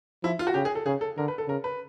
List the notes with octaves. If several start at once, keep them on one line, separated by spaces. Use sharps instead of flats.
F3 E4
F4
F#4
C#3 G4
G#4
A4
C#3 G#4
A4
D3 A#4
B4
A4
C#3 A#4
B4